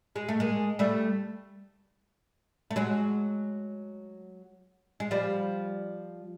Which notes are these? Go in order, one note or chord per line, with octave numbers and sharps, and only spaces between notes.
G#3
A3
G#3 A#3
G3 A3
A3
F#3 G#3
G#3
F3 G3